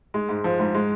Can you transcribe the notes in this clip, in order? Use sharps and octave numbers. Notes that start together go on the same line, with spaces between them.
G#3
G#2
F3
G#2
G#3